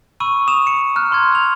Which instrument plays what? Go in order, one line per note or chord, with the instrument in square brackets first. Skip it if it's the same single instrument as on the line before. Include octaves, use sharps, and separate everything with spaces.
[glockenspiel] B5 C#6 E6 D#7
D#6 E7 F7
C#7
A#5 F6 F#6
A#5 C6 F#6 G#6
E6 F7